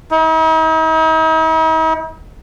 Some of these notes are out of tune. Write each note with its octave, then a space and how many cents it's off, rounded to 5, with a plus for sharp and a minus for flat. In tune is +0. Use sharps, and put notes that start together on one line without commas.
D#4 +45